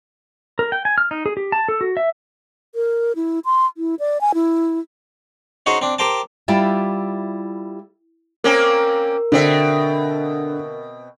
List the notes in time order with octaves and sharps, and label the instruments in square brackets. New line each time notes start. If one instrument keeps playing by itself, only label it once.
[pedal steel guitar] A#4
G5
G#5
F6
D#4
G#4
G4
A5
A4
F#4
E5
[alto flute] A#4
E4
C6
E4
D5
G#5
E4
[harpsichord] C#4 D#4 F#4 G#4 C5 C#5
C4 D4
G4 A#4 C5 G5 A5
[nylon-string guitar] G3 E4 F4 G4 D5 E5
[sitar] A#3 C4 C#4 [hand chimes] A#4
[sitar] B2 C4 E5 [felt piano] D3